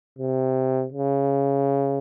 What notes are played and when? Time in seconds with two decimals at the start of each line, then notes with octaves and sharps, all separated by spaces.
0.19 C3
0.92 C#3